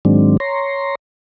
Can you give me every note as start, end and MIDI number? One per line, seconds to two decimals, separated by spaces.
0.05 0.37 44
0.05 0.37 51
0.05 0.37 54
0.05 0.37 56
0.05 0.37 60
0.05 0.37 62
0.40 0.95 73
0.40 0.95 82
0.40 0.95 84